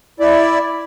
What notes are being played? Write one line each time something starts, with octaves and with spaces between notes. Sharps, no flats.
E4 D5